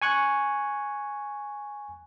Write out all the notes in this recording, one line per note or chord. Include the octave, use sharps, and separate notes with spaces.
G#5 C#6 F#6